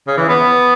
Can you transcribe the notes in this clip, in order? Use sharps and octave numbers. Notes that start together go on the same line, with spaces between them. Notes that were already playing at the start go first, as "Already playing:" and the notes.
C#3
E3
B3